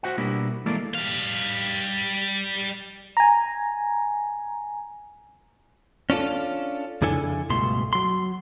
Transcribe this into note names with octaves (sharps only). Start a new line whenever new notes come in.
F#4 C5 E5 F#5
B2 G3 A#3 D4 E4
E3 G#3 A#3 E4 A4 D5
G3 F5
G#5 A#5
C#4 D4 F4 A4
F2 C#3 D4 E4 A4 G#5
C#2 G2 B2 A3 C6
F#3 C6